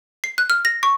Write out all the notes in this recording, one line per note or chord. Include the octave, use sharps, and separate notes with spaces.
C7
F#6
F6
A#6
C#6